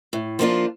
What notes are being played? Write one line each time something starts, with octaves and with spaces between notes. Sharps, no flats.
A2
F3 A#3 D4 F4